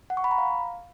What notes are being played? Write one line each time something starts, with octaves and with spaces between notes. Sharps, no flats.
F#5
C#6
B5
A#5
F5